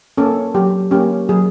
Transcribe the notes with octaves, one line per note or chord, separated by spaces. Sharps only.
A#3 C#4 A4
F#3 G4
A#3 C#4 G4
F#3 G#4